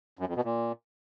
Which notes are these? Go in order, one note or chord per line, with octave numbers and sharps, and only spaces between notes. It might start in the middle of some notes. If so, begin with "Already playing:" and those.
F#2
F2
B2
A#2